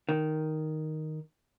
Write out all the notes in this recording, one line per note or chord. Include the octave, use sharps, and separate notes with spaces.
D#3